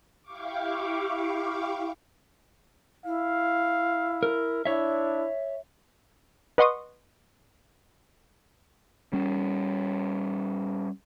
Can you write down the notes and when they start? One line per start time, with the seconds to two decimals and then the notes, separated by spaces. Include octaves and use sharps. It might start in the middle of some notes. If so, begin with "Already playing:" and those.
0.22 E4 G4 F5 C#6 D6
3.05 E4 F5
4.23 A#4
4.65 D4 E4 C#5 E5
6.58 B4 D#5 F#5 C6 C#6 D#6
9.13 G3 C#4